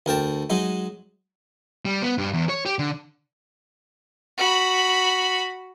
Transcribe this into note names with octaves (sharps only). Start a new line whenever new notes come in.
D2 A#4 G5 A5
F#3 G#3 D#4
G3
B3
G2
E2
C#5
G4
D3
F#4 B5